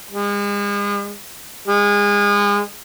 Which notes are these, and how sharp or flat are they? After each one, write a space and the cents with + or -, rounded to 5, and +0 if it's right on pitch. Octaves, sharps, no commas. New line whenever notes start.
G#3 -40
G#3 -30